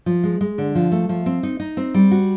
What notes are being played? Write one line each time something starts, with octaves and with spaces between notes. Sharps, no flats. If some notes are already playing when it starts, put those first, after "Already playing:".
F3
G#3
G#3
D3
F3
A3
F3
C4
D#4
D#4
C4
G3
F#4